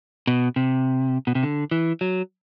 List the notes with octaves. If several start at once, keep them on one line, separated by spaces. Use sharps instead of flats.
B2
C3
B2
C3
D3
E3
F#3